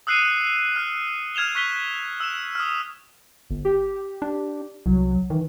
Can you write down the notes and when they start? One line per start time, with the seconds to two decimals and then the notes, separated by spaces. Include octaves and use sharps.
0.07 D#6 E6 F#6 C7 C#7 D#7
0.76 F6 F#6
1.35 F6 G#6 E7 F7 G7
1.55 C#6 F#6 B6 F7 G7
2.20 E6 E7
2.55 D#6 F6
3.50 G1
3.65 G4
4.22 D4
4.86 C2 F#3
5.30 D#3 E3